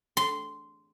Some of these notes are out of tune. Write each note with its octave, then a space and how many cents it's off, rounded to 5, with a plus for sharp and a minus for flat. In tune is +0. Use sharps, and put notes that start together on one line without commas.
C6 -10